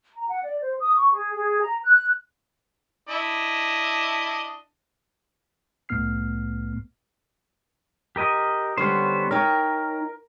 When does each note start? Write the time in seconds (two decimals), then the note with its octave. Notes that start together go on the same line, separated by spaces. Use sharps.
0.14 A#5
0.29 F#5
0.44 D5
0.61 C5
0.80 D#6
0.96 C#6
1.12 G#4
1.35 G#4
1.61 A#5
1.84 F#6
3.09 D4 E4 D#5
5.89 C2 A2 A3 B3 F6 C7
8.16 G4 A#4 D#5
8.77 D3 G3 B3 C#4 C5
9.31 D#4 A#4 C#5 G5